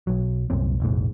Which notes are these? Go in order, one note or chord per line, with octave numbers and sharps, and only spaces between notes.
B1 F#3
C2 F#2 A#2 C4
F1 A#1 G#2